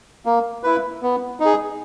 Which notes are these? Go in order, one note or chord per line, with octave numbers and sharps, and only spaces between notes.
A#3
E4 B4
B3
D#4
G#4